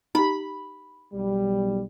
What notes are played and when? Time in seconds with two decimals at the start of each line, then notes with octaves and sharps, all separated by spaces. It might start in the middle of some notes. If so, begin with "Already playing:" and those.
0.15 D#4 G4 B5
1.13 B1 G3